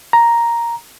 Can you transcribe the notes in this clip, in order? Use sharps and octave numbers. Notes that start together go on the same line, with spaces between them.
A#5